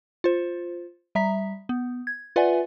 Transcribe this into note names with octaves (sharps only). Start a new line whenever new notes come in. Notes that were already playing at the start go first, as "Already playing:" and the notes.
F4 C5
G3 E5 A#5 B6
B3
G#6
F4 B4 D5 E5 F#5 G#5